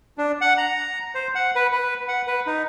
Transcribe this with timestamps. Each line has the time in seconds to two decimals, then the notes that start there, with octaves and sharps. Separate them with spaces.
0.18 D4
0.41 F#5
0.58 A#5
1.15 C5
1.35 F#5
1.56 B4
1.72 B4
2.08 F#5
2.27 B4
2.47 D#4